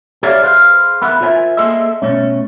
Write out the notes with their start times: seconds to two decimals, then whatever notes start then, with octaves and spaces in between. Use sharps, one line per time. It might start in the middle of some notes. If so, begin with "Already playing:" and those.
0.23 G4 A4 C#5 D5 E5 F5
0.42 G#4 B4 C5 F5
1.02 B3 E4 A#4
1.21 F4 A#4 C5 E5 G#5
1.57 A#3 G#4 A4 C5 D#5 E5
2.02 B2 A3 C#4